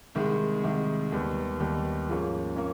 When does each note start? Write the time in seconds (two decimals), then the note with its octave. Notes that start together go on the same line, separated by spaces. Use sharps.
0.15 C2 C3 D#3 G#3
0.63 C2 C3 D#3 G#3
1.12 D#2 D#3 G3 B3
1.60 D#2 D#3 G3 B3
2.09 G#2 F3 A#3 C#4
2.56 A#3 C#4